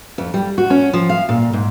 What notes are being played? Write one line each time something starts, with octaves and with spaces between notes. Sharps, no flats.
F2
G3
F#4
C#4
F3
F5
A#2
G#2